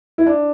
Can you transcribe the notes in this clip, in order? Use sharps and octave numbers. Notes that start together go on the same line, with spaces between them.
E4
D4